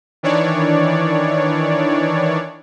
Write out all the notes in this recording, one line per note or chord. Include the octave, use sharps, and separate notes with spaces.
D#3 E3 D4 C#5 D5